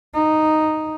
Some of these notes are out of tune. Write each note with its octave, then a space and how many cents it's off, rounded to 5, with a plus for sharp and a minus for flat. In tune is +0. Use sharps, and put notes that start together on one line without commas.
D#4 -5